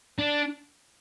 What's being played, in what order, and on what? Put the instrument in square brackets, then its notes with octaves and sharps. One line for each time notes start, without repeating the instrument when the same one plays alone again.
[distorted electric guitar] D4